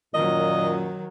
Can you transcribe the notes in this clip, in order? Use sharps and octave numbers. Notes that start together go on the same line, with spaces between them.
F#2 A#2 D#3 F#3 D#5